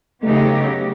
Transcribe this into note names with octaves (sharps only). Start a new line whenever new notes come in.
C#3 F#3 A3 B3 D#4 G4